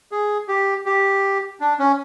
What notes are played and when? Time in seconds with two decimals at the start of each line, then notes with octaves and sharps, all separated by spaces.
0.12 G#4
0.48 G4
0.86 G4
1.60 D4
1.79 C#4